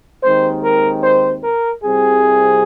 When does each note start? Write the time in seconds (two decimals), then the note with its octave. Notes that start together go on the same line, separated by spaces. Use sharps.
0.24 D#2 D#3 G#3 C4 C5
0.64 A#4
1.04 C5
1.44 A#4
1.84 C2 C3 G3 C4 G#4